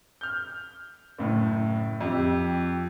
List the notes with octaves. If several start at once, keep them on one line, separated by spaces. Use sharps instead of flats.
F6 G6
F#1 A2
F2 G4